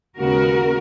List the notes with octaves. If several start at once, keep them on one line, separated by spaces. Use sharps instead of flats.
D#2 C#3 G#3 B3 F#4 A#4